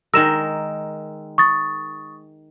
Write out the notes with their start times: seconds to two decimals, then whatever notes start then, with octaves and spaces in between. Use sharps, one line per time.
0.14 D#3 G#3 A#4 E6 E7
1.38 C#6 D#6 A6